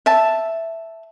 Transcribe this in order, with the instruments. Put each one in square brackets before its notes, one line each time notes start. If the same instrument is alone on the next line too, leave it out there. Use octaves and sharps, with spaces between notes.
[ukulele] E5 A5